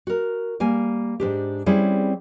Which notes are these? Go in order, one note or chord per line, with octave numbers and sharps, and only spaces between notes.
F#4 A#4
G3 A#3 G#5
G#2 E3 D4 G4
G3 C4 C#4 E4 G#4